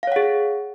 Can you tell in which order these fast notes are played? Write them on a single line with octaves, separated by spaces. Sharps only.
F5 C#5 F#5 G#4